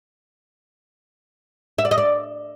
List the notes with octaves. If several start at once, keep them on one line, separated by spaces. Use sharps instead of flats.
E5
D5
D#5
D5